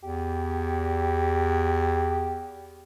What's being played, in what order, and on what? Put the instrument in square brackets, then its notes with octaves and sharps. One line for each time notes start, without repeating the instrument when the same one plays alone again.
[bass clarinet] E2 [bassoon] G4